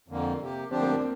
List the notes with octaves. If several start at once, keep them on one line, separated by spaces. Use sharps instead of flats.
F2 D3 A#3
C3 A#3 G4
D3 F3 C4 D4 G4
A#3
A#3